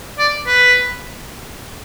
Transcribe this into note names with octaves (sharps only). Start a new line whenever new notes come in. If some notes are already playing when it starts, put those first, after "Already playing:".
D5
B4